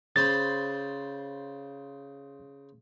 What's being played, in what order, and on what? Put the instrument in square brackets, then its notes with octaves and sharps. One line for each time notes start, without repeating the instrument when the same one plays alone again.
[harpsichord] C#3 C5 B5 [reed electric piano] A6